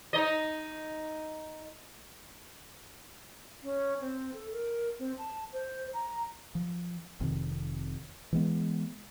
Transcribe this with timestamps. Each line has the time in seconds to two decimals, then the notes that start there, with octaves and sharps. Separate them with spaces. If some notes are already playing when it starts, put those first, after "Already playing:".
0.13 D#4 D#5
3.63 C#4
4.01 C4
4.34 A4
4.52 A#4
4.99 C4
5.18 A5
5.53 C5
5.93 A#5
6.55 F3
7.20 F1 F2 C3 D#3
8.33 E3 G#3 B3